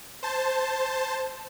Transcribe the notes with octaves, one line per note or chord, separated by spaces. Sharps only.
C5 A5